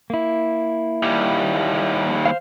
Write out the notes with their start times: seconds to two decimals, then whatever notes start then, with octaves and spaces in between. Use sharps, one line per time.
0.10 A#3 E4
1.03 D#2 G3
2.25 C5 F5